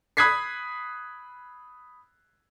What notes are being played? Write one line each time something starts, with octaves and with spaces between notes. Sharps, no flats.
B5 D#6 F#6 G#6 B6 C7